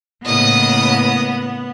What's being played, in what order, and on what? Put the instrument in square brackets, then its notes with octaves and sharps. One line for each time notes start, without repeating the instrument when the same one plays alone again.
[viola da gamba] A2 C#3 A#3 [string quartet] B3 [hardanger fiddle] D#5 D#6